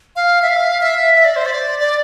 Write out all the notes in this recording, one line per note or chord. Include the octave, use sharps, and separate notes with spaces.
F5
E5
F5
E5
E5
D5
C5
D5
D5